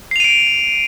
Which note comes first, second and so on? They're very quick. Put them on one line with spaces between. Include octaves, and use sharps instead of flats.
C7 F7 D#7 D7